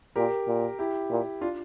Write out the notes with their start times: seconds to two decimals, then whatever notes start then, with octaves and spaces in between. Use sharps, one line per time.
0.16 A#2 G4 A#4
0.47 A#2
0.79 E4 G4
1.10 A#2
1.41 D4 F4